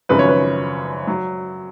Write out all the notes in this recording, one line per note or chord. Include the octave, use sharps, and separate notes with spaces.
G#1 F#2 C#3 F3 B4
C#5
B4
F#3